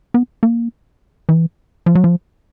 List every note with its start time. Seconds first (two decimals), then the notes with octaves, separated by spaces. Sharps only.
0.14 B3
0.43 A#3
1.29 E3
1.86 F3
1.95 F#3
2.04 F3